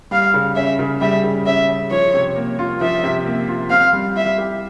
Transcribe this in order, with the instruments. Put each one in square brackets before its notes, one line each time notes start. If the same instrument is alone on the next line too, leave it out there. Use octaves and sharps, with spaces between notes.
[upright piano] G3 [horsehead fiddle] F5
[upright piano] C#3
[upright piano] C#4 [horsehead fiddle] E5
[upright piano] C#3
[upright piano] G3 [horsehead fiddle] E5
[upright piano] C#3
[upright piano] C#4 [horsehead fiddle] E5
[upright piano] C#3
[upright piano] F3 [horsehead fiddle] C#5
[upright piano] C3
A#3
F4
[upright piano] F3 [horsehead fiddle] E5
[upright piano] C3
A#3
F4
[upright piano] C4 [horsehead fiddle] F5
[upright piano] G3
[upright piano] E4 [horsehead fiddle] E5
[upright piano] G4